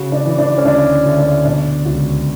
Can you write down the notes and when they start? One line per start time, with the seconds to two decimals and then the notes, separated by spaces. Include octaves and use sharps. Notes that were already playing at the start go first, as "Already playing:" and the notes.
Already playing: C#3 F#4
0.12 D4
0.25 E3
0.39 D4
0.58 C#4
0.65 D2 D4
1.05 D2
1.19 D4
1.45 B2 D4
1.85 C#2 F#4